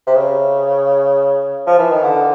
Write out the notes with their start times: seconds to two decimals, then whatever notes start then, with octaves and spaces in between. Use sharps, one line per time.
0.07 C3
0.15 C#3
1.67 F3
1.78 E3
1.91 D#3
2.03 D3